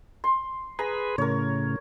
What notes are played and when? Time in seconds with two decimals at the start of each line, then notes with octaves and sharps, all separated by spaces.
0.24 C6
0.79 G#4 B4 A#5
1.18 A2 C#3 A#4 C#5